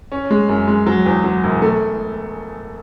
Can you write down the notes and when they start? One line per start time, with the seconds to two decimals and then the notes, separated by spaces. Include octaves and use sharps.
0.12 C#4
0.31 G#3
0.49 F#2
0.68 G#3
0.86 F#3
1.06 E2
1.24 F#3
1.44 E1
1.62 A3